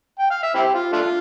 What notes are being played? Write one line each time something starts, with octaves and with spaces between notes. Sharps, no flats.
G5
F5
E5
C4 E4 G4
F4
A3 D4 F4